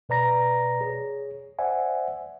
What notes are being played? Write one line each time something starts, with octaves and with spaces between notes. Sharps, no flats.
B2 B4 D5 A#5 A#6
G#4 C#5
C5 D5 E5 F#5 G#5